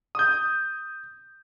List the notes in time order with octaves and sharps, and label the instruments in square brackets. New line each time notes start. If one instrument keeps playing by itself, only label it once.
[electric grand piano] D#6 G6